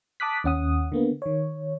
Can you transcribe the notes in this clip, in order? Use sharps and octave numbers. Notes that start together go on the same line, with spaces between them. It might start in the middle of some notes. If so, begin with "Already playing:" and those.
A5 D6 D#6 F#6 B6
D#2 C#4 F#5 D#6
D3 A#3 B3
D#3 C#5